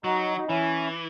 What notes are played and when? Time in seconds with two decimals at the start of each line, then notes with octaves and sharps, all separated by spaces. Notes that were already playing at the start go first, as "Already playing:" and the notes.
0.04 F#3 D#4 F#4
0.37 D#4
0.48 E3 C#4 E4